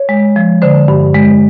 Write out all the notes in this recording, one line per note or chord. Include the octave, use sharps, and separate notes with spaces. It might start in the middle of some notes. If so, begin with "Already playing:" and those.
Already playing: C#5
G#3
F3
D3 C5
G2
G#3